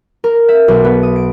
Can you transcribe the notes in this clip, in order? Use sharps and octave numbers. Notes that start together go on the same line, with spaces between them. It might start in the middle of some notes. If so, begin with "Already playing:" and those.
A#4
E5
B1
B3
D#6
D7